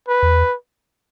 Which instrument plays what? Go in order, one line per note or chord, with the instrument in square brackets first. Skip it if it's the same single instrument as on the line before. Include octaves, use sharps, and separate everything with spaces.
[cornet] B4
[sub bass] E2